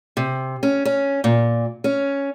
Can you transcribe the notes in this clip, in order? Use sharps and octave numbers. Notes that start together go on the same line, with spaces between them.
C3
C#4
C#4
A#2
C#4